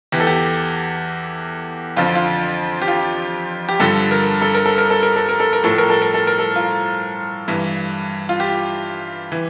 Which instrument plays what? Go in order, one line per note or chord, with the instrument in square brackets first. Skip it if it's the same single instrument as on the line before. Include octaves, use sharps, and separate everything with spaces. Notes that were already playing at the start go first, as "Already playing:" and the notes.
[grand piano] E2 E3 G4
A4
G4
F2 D3 F3 F4
F4
G4
F4
G4
G2 D3 F3 A4
A#4
A4
A#4
A4
A#4
A4
A#4
A4
A#4
A4
A#4
A2 F3 A4
A#4
A4
A#4
A4
A#4
A4
F4
G2 E3
F4
G4
E3